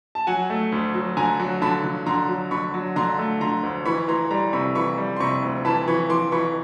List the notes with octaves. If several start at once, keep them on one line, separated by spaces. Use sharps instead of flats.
A5
F#3 F#5 G#5
A3
D2
F#3
D3 G#5 A#5
F#3
D3 A5 B5
D3
D3 A#5 C6
F#3
D3 B5 C#6
F#3
D3 A#5 C6
A3
D3 A#5 C6
D2
E3 B5 C#6
E3 A#5 C6
G3 A#5 C6
C3 B5 C#6
E3 B5 C#6
G3
C6
C3 B5 C#6
D2
E3 A5 B5
E3 B5 C#6
E3 C6 D6
E3 B5 C#6